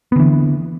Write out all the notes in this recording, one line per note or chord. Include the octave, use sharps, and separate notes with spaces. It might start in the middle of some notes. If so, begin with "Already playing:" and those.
D3 E3 B3